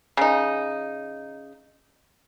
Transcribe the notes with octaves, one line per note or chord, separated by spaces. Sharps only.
C#3 D#4